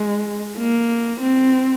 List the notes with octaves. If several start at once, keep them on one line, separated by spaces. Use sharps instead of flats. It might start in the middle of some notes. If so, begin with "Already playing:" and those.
Already playing: G#3
A#3
C4